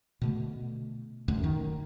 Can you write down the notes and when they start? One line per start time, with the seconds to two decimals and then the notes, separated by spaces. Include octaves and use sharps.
0.22 B2 D3 A3
1.28 D#1 F#2 D3 A3
1.44 D#3